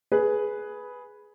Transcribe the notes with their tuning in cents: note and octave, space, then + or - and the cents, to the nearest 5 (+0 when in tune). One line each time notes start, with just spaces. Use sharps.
G#4 +10 B4 +0